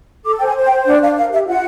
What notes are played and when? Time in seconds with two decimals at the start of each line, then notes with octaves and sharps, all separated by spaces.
0.24 A4 D6
0.38 C5 G5
0.46 G#5
0.56 C5
0.65 G5
0.70 C5
0.86 D4 F#5
1.02 D4 F5
1.16 A#4 F5
1.32 G4 E5
1.47 F4 F#5